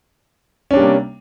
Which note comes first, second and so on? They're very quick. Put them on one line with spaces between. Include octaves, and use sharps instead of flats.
C#4 D4 G3 A#3 C3